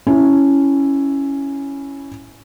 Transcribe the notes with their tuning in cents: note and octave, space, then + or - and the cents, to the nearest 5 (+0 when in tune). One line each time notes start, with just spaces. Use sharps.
C#4 +0 E4 +0